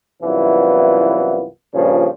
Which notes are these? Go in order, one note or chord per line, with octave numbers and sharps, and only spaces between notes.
C2 F#2 E3 B3 F4
G2 A#2 C#3 F3 D4